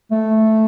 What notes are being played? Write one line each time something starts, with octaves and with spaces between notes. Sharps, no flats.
A3